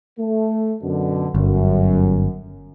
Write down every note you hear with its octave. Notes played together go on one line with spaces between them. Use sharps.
A3
F#2 B2 D3
G1 F#2